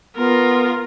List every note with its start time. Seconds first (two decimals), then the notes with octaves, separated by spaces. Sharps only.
0.16 B3 F4 A#4